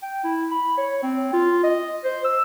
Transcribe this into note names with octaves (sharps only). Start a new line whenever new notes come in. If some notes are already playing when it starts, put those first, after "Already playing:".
G5
E4
B5
C#5
C4
F4
D#5
C5
E6